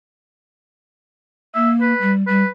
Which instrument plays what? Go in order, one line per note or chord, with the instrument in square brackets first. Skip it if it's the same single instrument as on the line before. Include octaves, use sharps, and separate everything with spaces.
[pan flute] A#3 [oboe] E5
[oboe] B4
[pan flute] G3
[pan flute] G3 [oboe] B4